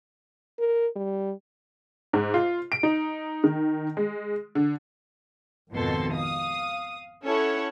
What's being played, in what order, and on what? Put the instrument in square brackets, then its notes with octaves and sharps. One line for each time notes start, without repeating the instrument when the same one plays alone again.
[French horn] A#4
G3
[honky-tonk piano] G#2
F4
D7
D#4
D#3
G#3
D3
[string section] G#1 F2 B2 D#3 A4 C6
F5 D#6
C#4 E4 A4 C#5 F#5